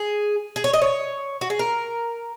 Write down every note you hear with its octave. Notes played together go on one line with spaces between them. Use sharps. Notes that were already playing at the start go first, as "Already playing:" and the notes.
Already playing: G#4
G#4
C#5
D#5
C#5
F#4
G#4
A#4